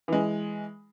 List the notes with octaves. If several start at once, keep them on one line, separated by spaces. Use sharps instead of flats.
E3 G#3